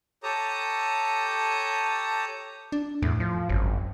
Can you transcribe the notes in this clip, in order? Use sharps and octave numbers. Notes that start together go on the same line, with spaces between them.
G4 A4 C#5 A5 A#5 D#6
D4
E2 A2
F3
G#1 F#2